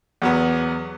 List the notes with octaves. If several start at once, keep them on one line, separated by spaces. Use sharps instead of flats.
E2 F#3 B3